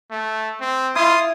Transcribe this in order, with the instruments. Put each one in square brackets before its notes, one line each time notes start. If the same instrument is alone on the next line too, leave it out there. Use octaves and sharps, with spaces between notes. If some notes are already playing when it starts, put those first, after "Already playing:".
[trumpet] A3
C4
[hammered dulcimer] E4 [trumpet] F4 [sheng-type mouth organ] C6 D#6